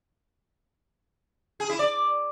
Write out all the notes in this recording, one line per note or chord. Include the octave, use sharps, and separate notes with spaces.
G#4
E4
D5